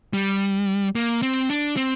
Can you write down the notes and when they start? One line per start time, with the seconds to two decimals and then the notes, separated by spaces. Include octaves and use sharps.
0.13 G3
0.95 A#3
1.22 C4
1.50 D4
1.77 C4